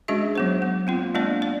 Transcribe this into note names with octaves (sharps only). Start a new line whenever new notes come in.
G#3 C#4 D4 F#4 G#4 E5
F#3 B3 C5
B3
A#3 C4 F4
G#3 A#3 B3 D4 D5
D5